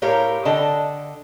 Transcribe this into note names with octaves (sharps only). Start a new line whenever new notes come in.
A2 G4 A#4 C#5 F5
D3 D#5 G5 A5